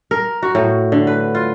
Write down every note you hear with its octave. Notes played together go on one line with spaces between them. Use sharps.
A#4
F#4
A2
D3
B4
F4